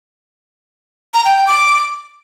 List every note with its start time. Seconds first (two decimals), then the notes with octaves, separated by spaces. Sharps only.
1.14 A#5
1.25 G5
1.36 G5
1.47 D6